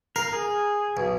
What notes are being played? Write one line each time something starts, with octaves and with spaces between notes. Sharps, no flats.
A#4 F5
G#4
B1